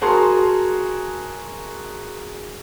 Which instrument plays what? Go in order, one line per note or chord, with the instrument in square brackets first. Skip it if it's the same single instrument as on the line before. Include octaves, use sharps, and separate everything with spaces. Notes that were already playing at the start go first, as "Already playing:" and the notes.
[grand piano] F#4 G#4 A#4 A5 C6